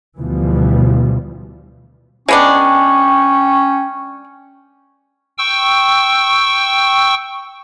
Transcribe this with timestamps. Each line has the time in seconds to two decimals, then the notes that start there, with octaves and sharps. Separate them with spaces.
0.17 D2 B2 E3 F3 G3
2.28 G#3 B3 C#4 D4 G5 C#6
5.38 G5 C#6 E6